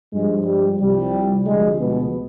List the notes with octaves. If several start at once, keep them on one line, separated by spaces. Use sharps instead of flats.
G2 F3 G#3
G3
C2 C3 F3 G3
D2 C3 F3 G#3
B2 B3